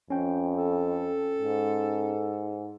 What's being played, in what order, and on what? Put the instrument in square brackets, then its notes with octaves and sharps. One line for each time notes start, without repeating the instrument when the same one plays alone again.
[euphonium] F2 [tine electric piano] C#4 G5
[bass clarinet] A4
[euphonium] G#2